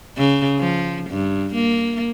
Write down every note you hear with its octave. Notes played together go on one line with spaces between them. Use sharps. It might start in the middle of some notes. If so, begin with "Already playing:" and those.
C#3
F3
G2
A#3